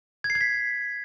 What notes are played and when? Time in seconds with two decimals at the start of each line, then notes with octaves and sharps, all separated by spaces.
0.24 G#6
0.30 C7
0.35 G#6
0.41 B6